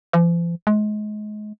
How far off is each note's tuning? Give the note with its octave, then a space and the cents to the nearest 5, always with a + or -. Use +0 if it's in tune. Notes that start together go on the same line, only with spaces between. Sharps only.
F3 -45
G#3 +30